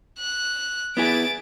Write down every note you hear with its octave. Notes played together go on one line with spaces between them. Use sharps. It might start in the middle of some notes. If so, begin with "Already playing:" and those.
F#6
B3 E4 G#4 A6 D7